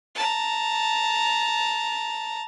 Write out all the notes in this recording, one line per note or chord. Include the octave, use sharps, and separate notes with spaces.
A5 A#5